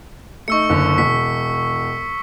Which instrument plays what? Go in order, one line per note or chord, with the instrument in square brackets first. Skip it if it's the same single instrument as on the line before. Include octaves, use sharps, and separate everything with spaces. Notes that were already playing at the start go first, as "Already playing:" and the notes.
[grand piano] A3 D#4 [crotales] C#6 E6 C#7
[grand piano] F#1 D3
[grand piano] E1 [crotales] B6